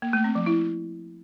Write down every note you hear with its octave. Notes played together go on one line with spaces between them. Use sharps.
A#3
A3
C4
F3
E4